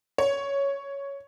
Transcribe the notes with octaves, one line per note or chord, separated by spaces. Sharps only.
C#5